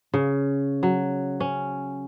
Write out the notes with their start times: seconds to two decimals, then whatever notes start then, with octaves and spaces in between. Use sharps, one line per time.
0.14 C#3
0.83 F#3
1.40 C#4